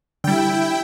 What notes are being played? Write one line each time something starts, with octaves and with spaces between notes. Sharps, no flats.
D3 G3 E4 G5